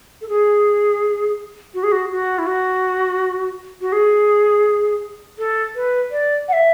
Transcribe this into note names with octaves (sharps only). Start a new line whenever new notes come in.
A4
G#4
F#4
G#4
F#4
F#4
E4
F#4
F#4
G#4
A4
B4
D5
F#5
E5